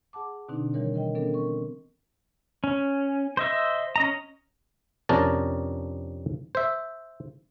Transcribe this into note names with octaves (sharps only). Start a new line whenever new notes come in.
G#4 F#5 A5 D6
B2 D3 C4 D4 D#4
D#3 E3 G3 A#4 C#5
A#4 D#5 G5
B3 C#4 D4 A4 A#4
C4 A#4 C#6
C#4
C5 D#5 E5
C#4 D#5 A#5
F2 C3 C#4 D4 A#4 A5
C5 E5